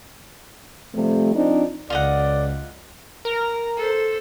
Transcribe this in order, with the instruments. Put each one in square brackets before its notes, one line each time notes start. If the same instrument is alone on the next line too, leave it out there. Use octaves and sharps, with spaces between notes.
[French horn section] C3 F3 G3 A3
F3 C4 D4 D#4
[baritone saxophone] C#2 [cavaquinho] F4 D#5 F#5 [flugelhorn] D5
[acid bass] A#4 [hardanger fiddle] A#5
[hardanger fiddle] A4 C5